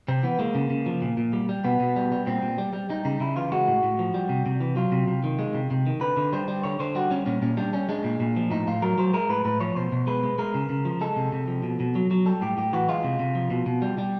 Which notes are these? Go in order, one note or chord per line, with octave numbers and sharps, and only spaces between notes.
C3 C4
E3 B3
G#3 A#3
C#3
C#3
F3
A#2
A#2
G3
G3
B2 B3
B2
G3
G3
A#2 C4
A#2
G3
G3
G3 D#4
C#3 D#4
C#3 E4
E3 F4
G#3 F#4
A2
A2
F3
G3
C3
C3
E3
F#3 F4
C3
C3
D#3
G#3
C3
C3
D#3
D3 B4
D3
G3 C5
G3
D3 C#5
D3 C5
G3 F#4
G3 C#4
A#2 C#4
A#2 C#4
G3 D4
G3 C#4
G#3 D4
A#2
A#2
F3
A2 D#4
A2 F4
F#3 A#4
F#3 C5
G#3 A#4
A2 B4
A2 B4
F3 C#5
B2 C5
B2
G#3 B4
G#3
G#3 A#4
C#3
C#3
F3
G#3 A4
C3
C3
F3
B2
B2
F#3
F#3
G3 A4
A2 G4
A2 G4
E3 F#4
G#3 F4
C3
C3
F3
B2
B2
G3
G3